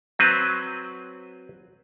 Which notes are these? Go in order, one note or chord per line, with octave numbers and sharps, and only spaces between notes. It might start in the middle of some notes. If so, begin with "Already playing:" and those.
F#3 C4 B4